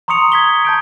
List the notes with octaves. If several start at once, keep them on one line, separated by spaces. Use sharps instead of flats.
A#5 C6 C#6 D#6 C#7 F7
G#6 B6 G7
A5 G6 D7